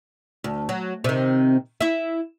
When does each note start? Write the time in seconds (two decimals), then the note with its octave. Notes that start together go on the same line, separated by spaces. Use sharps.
0.44 D2
0.69 F#3
1.04 C3 D#3
1.80 E4 E5